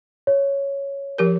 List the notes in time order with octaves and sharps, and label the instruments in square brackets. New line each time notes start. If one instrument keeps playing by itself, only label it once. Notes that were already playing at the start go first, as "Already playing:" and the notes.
[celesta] C#5
[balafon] F3 G4 A#4